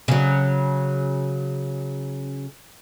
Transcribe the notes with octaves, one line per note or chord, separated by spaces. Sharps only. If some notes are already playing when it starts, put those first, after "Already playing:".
C#3 F#3